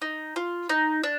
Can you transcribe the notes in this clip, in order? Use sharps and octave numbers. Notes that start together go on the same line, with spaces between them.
D#4
F4
D#4
D4